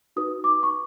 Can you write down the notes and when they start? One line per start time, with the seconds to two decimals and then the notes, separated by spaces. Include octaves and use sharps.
0.16 D#4 F#4 B4 D#6
0.44 D6
0.63 C#6